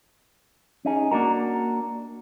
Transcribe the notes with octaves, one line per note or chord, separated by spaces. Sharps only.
C#4 D#4 G#4
A#3 D4 F#4 A#4